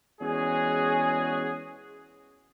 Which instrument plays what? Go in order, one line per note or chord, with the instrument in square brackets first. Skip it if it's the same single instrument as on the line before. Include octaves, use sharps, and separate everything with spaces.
[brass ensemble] E2 G#3 C#4 F#4 G#4